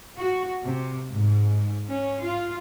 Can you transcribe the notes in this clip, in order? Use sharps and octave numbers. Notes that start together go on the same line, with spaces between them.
F#4
C3
G#2
C#4
F4